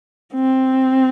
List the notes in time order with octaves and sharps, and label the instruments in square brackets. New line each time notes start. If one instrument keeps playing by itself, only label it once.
[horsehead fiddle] C4